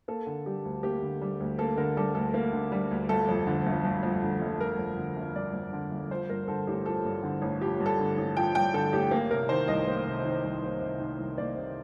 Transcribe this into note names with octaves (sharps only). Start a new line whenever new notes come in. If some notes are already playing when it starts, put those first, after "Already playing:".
A#3 A4
D3
G3 G4
D2
A#3 G4
D3
G3
D2
A#3 A4
D3 A#4
G3 A4
D2 A4
A#3
D3
G3
D2
G1 A4
F2
D3
G1
G1
F2
D3
G1
G1 A#4
F2
D3
G1
G1 D5
F2
D3
G1
F3 C5
G2 A#4
D3 A4
A1 G4
F3 A4
G2
D3
A1
F3 G4
G2
A4
D3
A1
F3 G5
G2 G5
D3 A4
A1 G4
A#3
C3 A#4
D#3 C5
C2 D#5
A#3
C3
D#3
C2
A#3
C3
D#3
C2
A#3 D5
C3